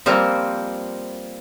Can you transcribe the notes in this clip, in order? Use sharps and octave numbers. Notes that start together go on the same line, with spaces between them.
F3 G3 A#3 C4